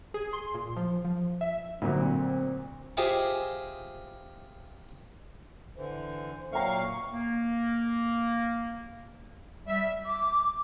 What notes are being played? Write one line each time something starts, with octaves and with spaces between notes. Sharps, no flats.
G#4
C6
A#2
F3
F3
E5
D2 A#2 F#3 C4
F4 G4 G#4 C5 D#5 E5
D3 E3 C5
A#2 F#3 A#3 E5 F5 G5 A#5 C#6
A#3
G3 E5
D6